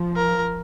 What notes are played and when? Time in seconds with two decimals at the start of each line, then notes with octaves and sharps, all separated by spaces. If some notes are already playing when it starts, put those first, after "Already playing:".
Already playing: F3
0.16 A#4